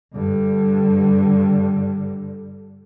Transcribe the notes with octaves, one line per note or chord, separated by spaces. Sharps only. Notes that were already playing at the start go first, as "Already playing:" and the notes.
G2 D3